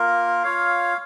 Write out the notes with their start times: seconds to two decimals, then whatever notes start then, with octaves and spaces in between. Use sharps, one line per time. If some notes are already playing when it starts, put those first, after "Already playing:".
Already playing: A#3 F4 A#4
0.43 F4 C#5 F5